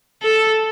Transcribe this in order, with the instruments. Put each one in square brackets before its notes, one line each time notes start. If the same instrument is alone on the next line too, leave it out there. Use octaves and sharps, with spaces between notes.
[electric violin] A4